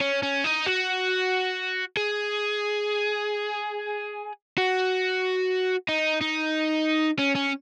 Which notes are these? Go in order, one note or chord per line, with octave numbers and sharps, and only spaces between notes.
C#4
C#4
D#4
F#4
G#4
F#4
D#4
D#4
C#4
C#4